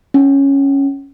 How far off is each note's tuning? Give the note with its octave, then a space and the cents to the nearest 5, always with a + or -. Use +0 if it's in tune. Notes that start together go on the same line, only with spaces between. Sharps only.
C#4 -5